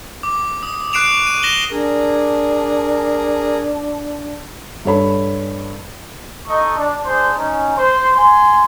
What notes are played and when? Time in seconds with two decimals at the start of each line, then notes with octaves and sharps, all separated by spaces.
0.23 D6
0.63 D#6
0.93 C#6 F#6 C7 D7 E7 F7
1.27 D#7
1.43 A#6 E7 F#7 G7
1.71 D4 G#4 A#4
4.85 G2 A4 C#5 B5
6.48 D#4 A4 D#5 C#6
6.77 D4
7.06 D4 G#4 C5
7.37 C#4 D#4
7.78 C5
8.16 G#5 C6